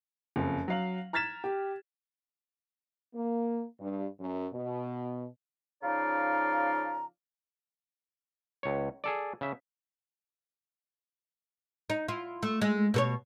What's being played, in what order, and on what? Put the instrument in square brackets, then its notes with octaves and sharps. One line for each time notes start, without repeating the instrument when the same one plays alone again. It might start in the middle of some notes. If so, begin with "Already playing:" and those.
[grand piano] F#1 F2
F#3 F5 F#7
A#5 F6 G#6 A6 B6 E7
G4
[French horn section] A#3
G2
F#2
B2
[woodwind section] C#3 F3 D#4 D5 F5 A#5
[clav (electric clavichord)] C#2 C#5
G#4 A4 D5
C#3 E5
[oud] D#4
E4 F4
A3
G#3
B2 A4 C#5